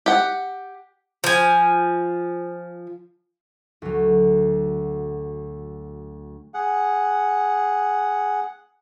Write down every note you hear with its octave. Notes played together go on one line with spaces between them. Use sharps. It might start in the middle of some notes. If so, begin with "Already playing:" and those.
G4 F#5
F3 G#5
D2 F#3
G#4 F#5